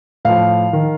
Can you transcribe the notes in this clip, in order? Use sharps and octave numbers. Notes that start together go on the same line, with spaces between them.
A2 F3 F5
D#3